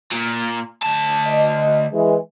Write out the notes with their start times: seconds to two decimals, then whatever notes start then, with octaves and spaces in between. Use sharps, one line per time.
0.12 A#2
0.83 D2 A5
1.27 D#5
1.92 E3 G#3